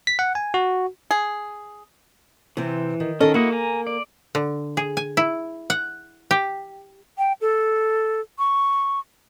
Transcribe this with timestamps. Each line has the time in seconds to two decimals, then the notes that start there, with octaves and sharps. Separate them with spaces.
0.07 B6
0.19 F#5
0.35 G#5
0.54 F#4
1.11 G#4
2.57 C3 E3 C4
3.00 D#3
3.20 D#3 C#4 A4 D#5
3.34 A#3 E4 F#4 D#5
3.53 G#5 A#5
3.87 D5
4.35 D3
4.77 G#4
4.97 G#5
5.17 E4
5.70 F#5
6.31 G4
7.18 G5
7.41 A4
8.39 C#6